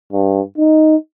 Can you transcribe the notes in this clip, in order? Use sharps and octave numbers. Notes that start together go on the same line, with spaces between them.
G2
D#4